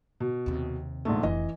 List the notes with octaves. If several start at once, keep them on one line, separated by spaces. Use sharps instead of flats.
B2
D#2 C3
A#1 G#2 A3
F1 E3 D#5